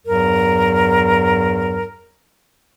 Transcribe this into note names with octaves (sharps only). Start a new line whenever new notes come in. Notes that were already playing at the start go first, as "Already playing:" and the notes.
E2 G2 F#3 A#4